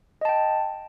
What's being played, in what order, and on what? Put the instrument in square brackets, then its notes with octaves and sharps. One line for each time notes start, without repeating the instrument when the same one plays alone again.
[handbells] D#5
A5
G5